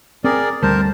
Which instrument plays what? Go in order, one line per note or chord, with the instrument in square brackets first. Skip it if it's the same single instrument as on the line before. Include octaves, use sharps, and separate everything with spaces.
[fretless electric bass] C4 [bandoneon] G#4 A#4 D5
[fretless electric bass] D2 G3 [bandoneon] A#4 C5 A5